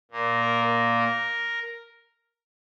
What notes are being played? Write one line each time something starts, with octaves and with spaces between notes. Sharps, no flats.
A#2 A#3
A#4
A#4